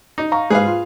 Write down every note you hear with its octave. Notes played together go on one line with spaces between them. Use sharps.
D#4
F5 A#5 C#6
G#2 G#4 B4 F5
F4